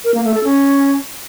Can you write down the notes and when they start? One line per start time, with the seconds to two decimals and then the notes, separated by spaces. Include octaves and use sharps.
0.04 A#4
0.14 A#3
0.24 A3
0.34 A4
0.44 C#4